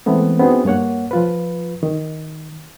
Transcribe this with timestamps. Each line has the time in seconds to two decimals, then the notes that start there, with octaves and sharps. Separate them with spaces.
0.06 E3 G#3 A3 B3 C4
0.39 B3 C4 D4 D#4 F#4 G#4
0.65 G2 A#3 C#5 F#5
1.11 F3 F4 B4
1.83 D#3